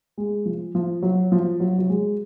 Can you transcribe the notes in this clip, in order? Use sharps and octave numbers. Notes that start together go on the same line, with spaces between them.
G#3
F3
F3
F#3
F3
F#3
F#3
G#3